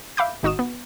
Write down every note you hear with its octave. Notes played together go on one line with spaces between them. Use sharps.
E5 F5 B5 D6 G6
G#1 D#4 F#4 D#6 E7
B3